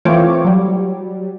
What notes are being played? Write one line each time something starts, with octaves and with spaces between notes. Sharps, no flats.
E3 A3 C4 F4 C#5 D6
F#3 G3